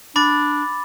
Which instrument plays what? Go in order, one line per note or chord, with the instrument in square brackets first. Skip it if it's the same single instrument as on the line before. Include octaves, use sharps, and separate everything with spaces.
[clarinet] D4 [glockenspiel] B5 D6 A6